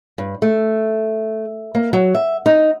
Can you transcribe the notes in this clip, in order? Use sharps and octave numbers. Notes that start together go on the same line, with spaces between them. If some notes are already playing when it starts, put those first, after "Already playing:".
G2
A3
A#3
F#3
E5
D#4